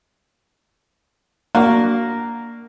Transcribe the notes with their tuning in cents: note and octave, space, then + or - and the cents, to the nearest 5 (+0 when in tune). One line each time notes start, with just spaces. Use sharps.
A#3 +0 D4 +0 F#4 +10